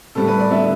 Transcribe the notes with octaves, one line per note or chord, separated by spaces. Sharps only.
A2 G3 B3 A4
B4
D5
D3 B3 E5